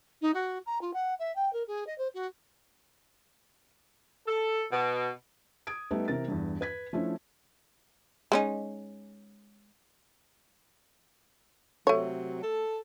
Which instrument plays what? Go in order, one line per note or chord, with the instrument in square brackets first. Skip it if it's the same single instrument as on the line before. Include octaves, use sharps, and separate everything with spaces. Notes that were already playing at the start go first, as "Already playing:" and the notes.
[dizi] D#4
F#4
A#5
F4
F#5
E5
G5
A#4
G#4
D#5
C5
F#4
[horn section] A4
B2
[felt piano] D#6 G#6 D7
G3 A3 B3 D#4
C3 E3 A#4 A6
E2 G2
B4 G#6 B6
F3 A3 C#4 D4 E4
[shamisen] G#3 C#4 D#4
[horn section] C3 F#3 [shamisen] A3 C#5
[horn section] A4